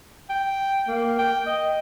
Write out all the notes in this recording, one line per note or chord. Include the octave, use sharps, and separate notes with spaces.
G5
A#3
G5
D#5